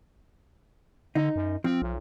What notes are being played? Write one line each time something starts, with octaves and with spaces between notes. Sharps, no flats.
D3 D#4
F#2
F3 C4
B1